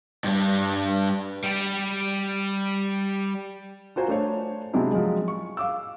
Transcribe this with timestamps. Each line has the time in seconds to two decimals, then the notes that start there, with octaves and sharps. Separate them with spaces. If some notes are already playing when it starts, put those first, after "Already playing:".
0.24 G2 G3
1.43 G3 G4
3.96 F4 F#4 C5 G#5 A#5
4.08 A3 D4 C5 C#5
4.74 C3 F#3 G#3 D4 E4
4.92 F3 F#3 G#3
5.28 C#6
5.57 F5 D6 E6